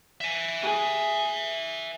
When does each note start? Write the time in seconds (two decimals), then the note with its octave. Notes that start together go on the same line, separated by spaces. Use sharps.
0.21 E5 G#5
0.62 G#4